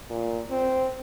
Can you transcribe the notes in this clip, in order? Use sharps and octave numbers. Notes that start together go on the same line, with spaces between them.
A#2
C4